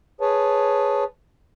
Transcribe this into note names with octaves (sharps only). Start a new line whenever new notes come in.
G#4 B4 C#5 A5